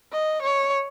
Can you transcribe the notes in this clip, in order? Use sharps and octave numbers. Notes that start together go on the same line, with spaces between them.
D#5
C#5